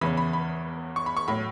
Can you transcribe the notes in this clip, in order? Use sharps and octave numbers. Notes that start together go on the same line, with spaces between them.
E2 C#3 E3 B5
B5
B5
C#6
B5
C#6
A2 F#3 B5